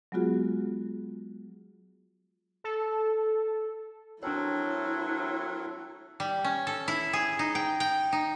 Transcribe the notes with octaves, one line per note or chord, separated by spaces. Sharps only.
F#3 G#3 B3 F4 F#4 G#4
A4
F#3 C4 D4 E4 A4 A#4 C#5
G3
C#4
A4
E4
G#4
D#4
G5
G5
D#4